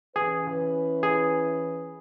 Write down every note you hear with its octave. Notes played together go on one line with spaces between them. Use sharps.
E3 C#4 E4 G#4 B4
G#4